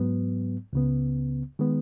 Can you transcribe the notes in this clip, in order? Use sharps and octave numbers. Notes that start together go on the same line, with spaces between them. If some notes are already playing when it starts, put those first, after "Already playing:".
Already playing: G#2 F#3 B3
C#2 C#3 B3
D#3 G#3 B3